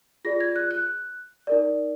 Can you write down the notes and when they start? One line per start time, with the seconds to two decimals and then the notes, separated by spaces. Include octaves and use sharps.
0.24 F4 G#4 D5 A#6
0.40 G#6
0.56 F#6
0.71 F#6
1.47 D#4 A#4 D5